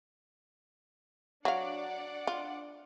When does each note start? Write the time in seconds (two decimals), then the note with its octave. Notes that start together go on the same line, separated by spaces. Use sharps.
1.45 F#3 D4 D5 F5 F#5
2.27 F4